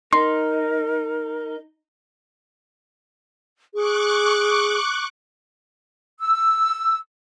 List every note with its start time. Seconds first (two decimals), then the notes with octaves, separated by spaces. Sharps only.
0.13 D#4 A#4 C6
3.74 G#4 C#6 D6 F#6
6.20 E6